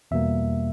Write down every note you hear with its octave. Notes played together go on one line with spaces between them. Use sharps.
E2 B2 G3 A#3 E5